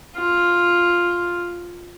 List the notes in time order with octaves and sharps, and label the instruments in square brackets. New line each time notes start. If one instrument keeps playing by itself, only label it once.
[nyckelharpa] F4